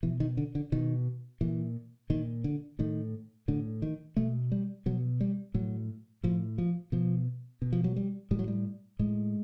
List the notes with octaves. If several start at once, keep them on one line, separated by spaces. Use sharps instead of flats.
B2 E3
D#3
D3
D3
B2 D#3
A#2 E3
A#2 D#3
D3
A2 D#3
A2 D3
D#3
B2 A3
G3
B2 F#3
G3
A2 F#3
A2 F3
F3
B2 F3
B2
F3
F#3
G3
A2 G3
F#3
G3
A2 G#3